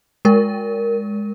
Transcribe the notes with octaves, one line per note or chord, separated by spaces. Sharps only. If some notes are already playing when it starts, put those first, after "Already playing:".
G#3 A#4